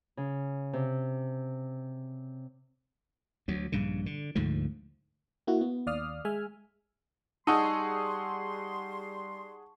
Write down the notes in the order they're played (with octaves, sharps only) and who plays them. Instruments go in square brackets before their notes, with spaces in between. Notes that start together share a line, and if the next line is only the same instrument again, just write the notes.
[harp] C#3
C3
[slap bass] D2 F#3
A#1 G2 C#3
D3
D2 G#2 D3 F3
[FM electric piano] A#3 E4 F#4
B3
D#2 D5 F5 D#6 F6
G#3 E5 G#5 F6
[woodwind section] G3 C6 [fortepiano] D#4 [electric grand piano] G#4 F#5 E6 [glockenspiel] A5 C#6